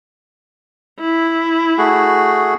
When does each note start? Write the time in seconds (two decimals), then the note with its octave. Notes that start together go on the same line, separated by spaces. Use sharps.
1.00 E4
1.78 A3 F#4 G#4